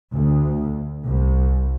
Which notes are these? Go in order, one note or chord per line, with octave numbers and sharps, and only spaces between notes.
D2
C2